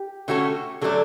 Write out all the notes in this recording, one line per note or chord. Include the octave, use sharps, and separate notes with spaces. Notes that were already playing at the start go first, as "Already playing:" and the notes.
Already playing: G4
D3 A3 C#4 F#4 A4
D3 F#3 A3 D4 A4